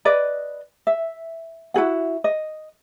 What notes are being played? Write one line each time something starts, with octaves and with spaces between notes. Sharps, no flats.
B4 D5 D#5
E5
E4 F#4 G#4 F#5
D#5